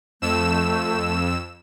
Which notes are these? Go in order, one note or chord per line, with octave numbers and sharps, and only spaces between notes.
F2 A3 E6 E7